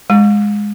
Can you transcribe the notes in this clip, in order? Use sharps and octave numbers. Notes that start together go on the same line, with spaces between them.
G#3